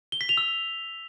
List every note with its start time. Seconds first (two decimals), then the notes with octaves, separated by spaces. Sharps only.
0.12 G7
0.21 B6
0.29 F7
0.37 E6